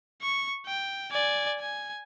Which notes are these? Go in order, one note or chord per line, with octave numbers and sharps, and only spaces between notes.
C#6
G5
D5 G#5
G#5